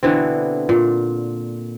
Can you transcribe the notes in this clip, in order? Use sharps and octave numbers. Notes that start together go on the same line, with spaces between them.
B2 D3 E3 C4
A#2